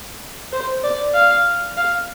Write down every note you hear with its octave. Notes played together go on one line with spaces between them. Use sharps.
C5
D5
F5
F5